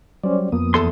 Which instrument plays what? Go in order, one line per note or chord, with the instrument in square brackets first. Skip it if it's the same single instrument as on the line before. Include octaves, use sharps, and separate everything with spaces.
[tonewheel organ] F#3 G3 [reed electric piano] C#4 C5 D5
[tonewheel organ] F2 B3 D#6 [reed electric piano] F3 A#3
[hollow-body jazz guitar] E2 A4 C6